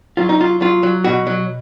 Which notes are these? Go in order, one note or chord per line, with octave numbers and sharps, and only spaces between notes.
F#3 F4
D#4
F#3 F4
F#3 F4
F#3
B2 F#4
F#3